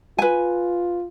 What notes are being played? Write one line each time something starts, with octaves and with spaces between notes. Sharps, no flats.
F4 B4 G#5